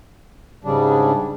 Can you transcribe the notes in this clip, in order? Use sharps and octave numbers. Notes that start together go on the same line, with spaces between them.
G#2 C#3 G3 D4